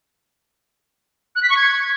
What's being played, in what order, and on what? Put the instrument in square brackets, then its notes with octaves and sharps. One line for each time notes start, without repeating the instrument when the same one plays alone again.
[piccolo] F#6
B6
C#6
G#6